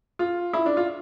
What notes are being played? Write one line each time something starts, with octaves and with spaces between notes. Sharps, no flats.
F4
E4
D4
F4